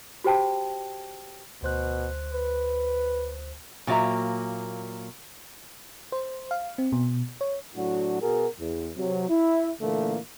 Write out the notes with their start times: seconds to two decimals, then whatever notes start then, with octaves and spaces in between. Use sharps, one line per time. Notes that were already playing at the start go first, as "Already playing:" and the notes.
0.24 F#4 G4 C5 G5 A5
1.63 D2 B2 C5 F#6
2.33 B4
3.87 A#2 F#3 A#3 E5 A#5
6.12 C5
6.51 F5
6.78 C4
6.92 B2
7.41 C#5
7.76 A2 F#3 D4 F#4
8.21 B2 F#4 G#4 A#4
8.59 E2
8.96 C3 F#3
9.29 E4
9.81 A#2 D3 E3 A3 A#3